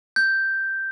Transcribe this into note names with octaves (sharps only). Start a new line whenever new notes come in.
G6